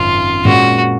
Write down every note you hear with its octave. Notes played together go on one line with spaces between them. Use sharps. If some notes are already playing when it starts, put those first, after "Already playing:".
Already playing: G#1 F#2 C#3 F4
A#2 G#3 C#4 F#4